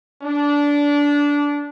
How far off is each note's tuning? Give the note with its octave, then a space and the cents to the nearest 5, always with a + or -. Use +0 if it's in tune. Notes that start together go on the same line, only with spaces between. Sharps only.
D4 -20